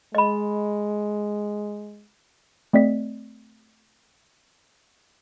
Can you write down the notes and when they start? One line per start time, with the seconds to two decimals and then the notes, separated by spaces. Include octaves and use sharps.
0.15 G#3 D#5 B5
2.73 A3 C4 D5 D#5 B6